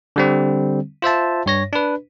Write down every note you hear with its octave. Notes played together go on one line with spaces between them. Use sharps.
D3 G3 C4
F4 C5 E5 A5
G2 C#5 A#6
D4 B4